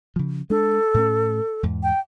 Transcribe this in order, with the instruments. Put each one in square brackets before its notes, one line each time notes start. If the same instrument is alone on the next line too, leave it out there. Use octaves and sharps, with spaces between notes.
[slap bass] C#3 F3
[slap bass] G#3 D4 [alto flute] A4
[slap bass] A2 A3 C#4
E2 G#2
[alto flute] G5